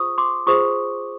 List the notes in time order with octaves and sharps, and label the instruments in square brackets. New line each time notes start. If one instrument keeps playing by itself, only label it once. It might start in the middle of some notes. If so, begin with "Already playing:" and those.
Already playing: [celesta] F4 G#4 C5 C#6 D#6
C6 D6
F4 G#4 C5 C#6 D#6